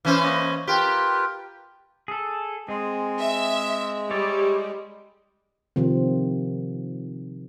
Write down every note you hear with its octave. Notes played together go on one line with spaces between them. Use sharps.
E3 C#4 C5
A#3 D#5
F4 G4 A#4 B4
G#4 A4
G#3 C4 G#4
E5
G3 E4 C#5 D5
C3 D#3 F3 C4